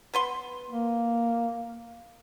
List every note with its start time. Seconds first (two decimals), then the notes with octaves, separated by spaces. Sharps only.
0.14 B3 B4 C6
0.70 A#3